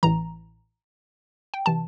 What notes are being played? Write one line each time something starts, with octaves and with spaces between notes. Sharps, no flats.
A1 A2 E3 A#5
G5
C3 E3 A5